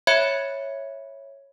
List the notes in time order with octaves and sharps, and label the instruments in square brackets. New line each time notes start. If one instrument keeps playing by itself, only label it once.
[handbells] C#5 E5 B5 G#6 C#7